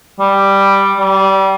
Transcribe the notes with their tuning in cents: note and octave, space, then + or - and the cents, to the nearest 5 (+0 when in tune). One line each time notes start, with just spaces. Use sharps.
G3 +5
G3 -25